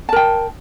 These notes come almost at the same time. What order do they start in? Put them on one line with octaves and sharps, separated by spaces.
A5 A#4 G5